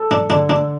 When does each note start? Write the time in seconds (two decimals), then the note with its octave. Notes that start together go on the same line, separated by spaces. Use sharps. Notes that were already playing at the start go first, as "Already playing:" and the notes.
Already playing: A4
0.11 D4
0.30 D3 D4
0.50 D4